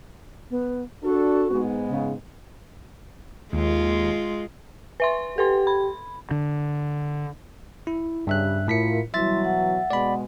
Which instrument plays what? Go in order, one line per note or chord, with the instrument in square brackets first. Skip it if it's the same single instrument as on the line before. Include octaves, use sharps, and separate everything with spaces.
[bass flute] B3
[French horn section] D4 A4 [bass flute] F#4
[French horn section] G#2 G#3 B3
[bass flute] C#3
[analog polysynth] D#2 [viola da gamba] G#3 F4
[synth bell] B4 E5 C6
[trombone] G4 [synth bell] A4 B4 C6
[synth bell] B5
[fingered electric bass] D3
[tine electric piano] E4
[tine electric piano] G2 E5 F#6 [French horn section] C#3 G3
[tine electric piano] A2 B6 C#7 [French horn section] E4 F4 A#4
[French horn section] B2 E3 F#3 [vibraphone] G3 E4 C6 [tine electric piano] E5 A6
[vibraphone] F#5
[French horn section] B2 G#3 [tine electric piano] D5 B5